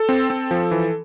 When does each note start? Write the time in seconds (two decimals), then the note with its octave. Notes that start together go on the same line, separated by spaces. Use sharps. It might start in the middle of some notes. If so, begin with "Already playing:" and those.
Already playing: A4
0.09 C4
0.30 C4
0.51 F3
0.71 E3